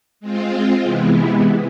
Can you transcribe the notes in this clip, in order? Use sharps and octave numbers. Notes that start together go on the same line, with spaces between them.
G#3 C4 F4
C3 E3 G#3 B3 E4